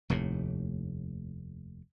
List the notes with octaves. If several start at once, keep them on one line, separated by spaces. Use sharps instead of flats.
F1 D#2 A2